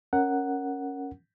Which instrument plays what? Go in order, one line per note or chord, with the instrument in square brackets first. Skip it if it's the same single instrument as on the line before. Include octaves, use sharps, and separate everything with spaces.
[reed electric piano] C#4 A#4 F#5